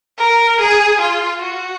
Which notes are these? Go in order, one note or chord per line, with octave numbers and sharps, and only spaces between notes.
A#4
G#4
F4
F#4